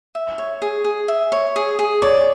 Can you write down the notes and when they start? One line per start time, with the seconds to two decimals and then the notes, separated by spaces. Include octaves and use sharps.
0.15 E5
0.38 C#5
0.62 G#4
0.84 G#4
1.08 E5
1.32 C#5
1.56 G#4
1.79 G#4
2.02 C#5 D5